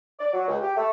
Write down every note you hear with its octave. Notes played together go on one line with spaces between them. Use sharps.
D5
F#3
C#2
G4
A3